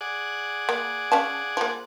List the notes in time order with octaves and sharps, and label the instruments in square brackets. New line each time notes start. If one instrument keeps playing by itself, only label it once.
[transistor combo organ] G#4 D5 F#5
[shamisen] A#3
C#4 F5 A5
F3 A#3